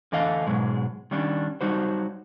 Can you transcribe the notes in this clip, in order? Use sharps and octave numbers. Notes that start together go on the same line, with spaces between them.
D3 E3 A3 D4 D#5 F5
G#2 B2 F#3 G#3
D#3 G3 C#4 D4
F#3 G3 D#4 F#4 C5